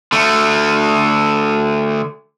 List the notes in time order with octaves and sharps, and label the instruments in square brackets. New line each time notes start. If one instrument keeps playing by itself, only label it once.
[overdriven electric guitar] D3 A3